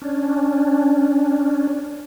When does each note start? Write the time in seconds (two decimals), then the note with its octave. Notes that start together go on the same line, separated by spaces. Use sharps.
0.02 C#4 D4